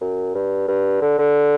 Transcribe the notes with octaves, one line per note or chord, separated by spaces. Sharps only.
F#2
G2
G2
D3
D3